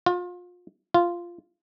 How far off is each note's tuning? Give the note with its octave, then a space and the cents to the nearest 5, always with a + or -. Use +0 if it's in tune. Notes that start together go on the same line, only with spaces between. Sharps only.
F4 +30
F4 -10